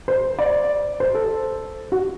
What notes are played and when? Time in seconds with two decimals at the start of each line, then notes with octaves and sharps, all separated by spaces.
0.08 C5
0.39 D5
1.00 C5
1.15 A4
1.92 F#4